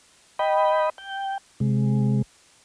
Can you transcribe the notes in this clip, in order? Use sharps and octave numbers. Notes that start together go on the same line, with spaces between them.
D#5 G5 B5
G5
C3 G#3